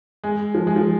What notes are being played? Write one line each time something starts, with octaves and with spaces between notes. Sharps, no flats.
G#3
F3
G#3
F3